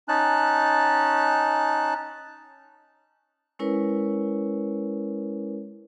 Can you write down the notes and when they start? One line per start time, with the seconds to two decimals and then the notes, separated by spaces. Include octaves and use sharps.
0.08 C#4 D#4 A5 F#6
3.59 G#3 C#4 E4 A#4 B4 C#5